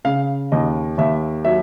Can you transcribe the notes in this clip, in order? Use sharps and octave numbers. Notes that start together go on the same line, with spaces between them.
C#3 F5
D#2 D#5
D#2 E5
F#3 E5